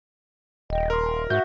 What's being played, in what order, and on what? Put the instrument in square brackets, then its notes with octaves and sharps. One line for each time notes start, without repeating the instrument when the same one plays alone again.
[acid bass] D#1 [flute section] D#5 G5
[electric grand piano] A#4 [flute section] C6
[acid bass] G#2 [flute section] F#4 E5 F#5 [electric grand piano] G6